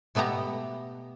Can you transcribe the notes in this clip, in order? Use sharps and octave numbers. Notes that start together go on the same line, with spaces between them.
B2 A3 B3 G4 A#5